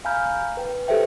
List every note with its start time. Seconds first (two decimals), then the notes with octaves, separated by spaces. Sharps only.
0.05 F5 G#5 A#5 B5 F6 G6
0.57 B4 G5
0.88 G4 A4 B4 C5 E5 G5